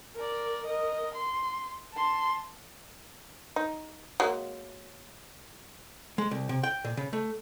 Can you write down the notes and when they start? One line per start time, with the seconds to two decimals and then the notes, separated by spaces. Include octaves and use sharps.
0.15 A#4 D5
0.66 A#4 D#5
1.15 C6
1.94 A5 C6
3.56 D#4
4.20 F#3 G#3 A#3
6.18 G#3
6.31 C2
6.49 C3
6.63 G5
6.85 A#2
6.97 C#3
7.13 A3